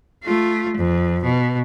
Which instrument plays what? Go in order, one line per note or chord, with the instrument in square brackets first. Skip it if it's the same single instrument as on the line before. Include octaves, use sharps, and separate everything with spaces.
[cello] A3 F4
F2
B2